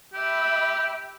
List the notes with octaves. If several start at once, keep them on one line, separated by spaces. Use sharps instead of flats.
G4 E5 B5